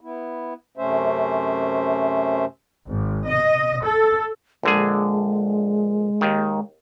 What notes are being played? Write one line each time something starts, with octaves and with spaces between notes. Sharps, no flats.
B3 E4
F#2 C3 A3 C#4 C5 E5
G#1
D#5
A4
A#1 D3 G#3 G#4
D#2 D#3